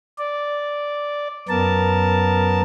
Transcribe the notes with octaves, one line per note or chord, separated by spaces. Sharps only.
D5
F#2 B3 A#4 A5